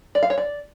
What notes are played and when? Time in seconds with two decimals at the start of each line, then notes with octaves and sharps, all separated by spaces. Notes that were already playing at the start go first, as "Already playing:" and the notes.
0.15 D5
0.23 F5
0.30 C#5
0.38 D5